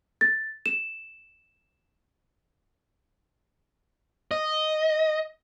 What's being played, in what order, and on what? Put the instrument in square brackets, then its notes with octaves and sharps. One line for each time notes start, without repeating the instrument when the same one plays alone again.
[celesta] A6
E7
[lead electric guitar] D#5